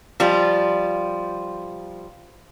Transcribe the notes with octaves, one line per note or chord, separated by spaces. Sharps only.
F3 G3 F4